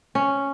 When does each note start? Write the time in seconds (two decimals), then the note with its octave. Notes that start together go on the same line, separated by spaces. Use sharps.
0.15 C#4